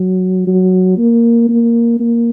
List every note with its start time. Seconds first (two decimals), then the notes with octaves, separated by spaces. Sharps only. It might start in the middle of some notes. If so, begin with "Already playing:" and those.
Already playing: F#3
0.47 F#3
0.98 A#3
1.49 A#3
2.00 A#3